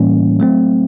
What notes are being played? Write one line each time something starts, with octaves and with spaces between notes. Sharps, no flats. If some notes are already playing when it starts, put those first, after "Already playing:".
Already playing: A2 E3 G3 A#3 C#4
F#3 A3 C4